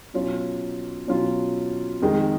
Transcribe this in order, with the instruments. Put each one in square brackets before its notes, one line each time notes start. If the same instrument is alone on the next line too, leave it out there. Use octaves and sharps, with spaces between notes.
[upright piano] B2 F#3 C#4 F4
B2 F#3 C#4 F4
F2 D#3 G#3